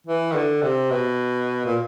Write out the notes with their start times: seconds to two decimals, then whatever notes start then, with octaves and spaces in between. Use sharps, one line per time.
0.07 E3
0.31 D#3
0.35 D3
0.62 C3
0.91 B2
1.65 A#2